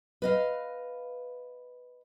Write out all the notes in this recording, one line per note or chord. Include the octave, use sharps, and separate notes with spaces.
B4 D#5 F5